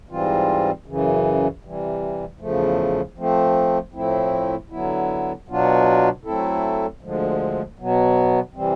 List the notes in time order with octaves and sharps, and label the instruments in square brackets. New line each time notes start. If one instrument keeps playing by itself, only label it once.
[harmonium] G#2 E3 G3 C4 F4
F#2 C#3 E3
C3 E3 G3
E2 C#3 F3 A3
F3 A3 C4
A2 F3 A3 C4 E4
D3 F#3 B3 E4
B2 F#3 B3 D4 F4
F#3 A3 C4 E4 A4
D2 D3 F3 G#3
B2 F#3 B3
C3 E3 G3 C4